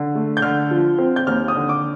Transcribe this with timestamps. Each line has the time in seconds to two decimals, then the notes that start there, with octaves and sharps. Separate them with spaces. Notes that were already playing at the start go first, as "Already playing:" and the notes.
Already playing: D3
0.15 A3
0.37 G6
0.42 D3 F6
0.71 F3
0.98 C4
1.16 G6
1.27 D#2 F6
1.48 D#6
1.55 D3
1.69 D6